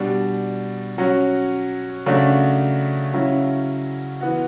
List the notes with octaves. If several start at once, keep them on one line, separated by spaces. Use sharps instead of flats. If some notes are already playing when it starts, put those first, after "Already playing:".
Already playing: B2 G3 D4
F#3 C#4 F#4
C#3 F#3 A3 D4 F#4
C#3 F#3 C#4 E4
E3 B3 F#4